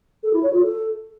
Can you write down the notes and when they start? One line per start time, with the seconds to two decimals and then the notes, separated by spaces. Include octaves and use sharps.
0.24 A4
0.33 E4
0.43 C#5
0.53 F4
0.63 A4